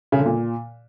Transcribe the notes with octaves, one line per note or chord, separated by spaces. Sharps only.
C#3
D3
A#2